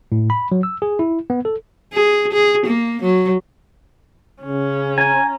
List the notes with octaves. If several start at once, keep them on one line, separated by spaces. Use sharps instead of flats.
A2
B5
F#3
E6
G#4
E4
B3
A4
G#4
G#4
A#3
F#3
C#3 C#4
G#5 A#5